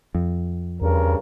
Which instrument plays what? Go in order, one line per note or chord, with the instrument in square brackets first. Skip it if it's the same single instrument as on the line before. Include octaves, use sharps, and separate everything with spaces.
[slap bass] F2
[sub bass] E2 [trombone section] G2 C#3 A#4